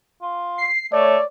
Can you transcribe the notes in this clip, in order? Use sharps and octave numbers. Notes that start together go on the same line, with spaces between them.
F4
C7
A3 C#5 D5